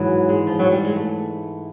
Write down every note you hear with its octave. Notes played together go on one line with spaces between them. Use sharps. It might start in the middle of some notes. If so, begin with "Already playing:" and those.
Already playing: G#2 E3 F#3
G#3
F3
F#3
G3
G#3
A3